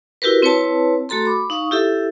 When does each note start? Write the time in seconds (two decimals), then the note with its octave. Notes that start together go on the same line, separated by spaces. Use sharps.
0.22 E4 F#4 G4 A#4 B4
0.42 C4 E4 B4 C#5 A5
1.09 A3 F#4 A4 A#5 C6
1.25 B5 D6
1.50 D#4 F5 C#6 D#6
1.71 E4 G4 A4 E5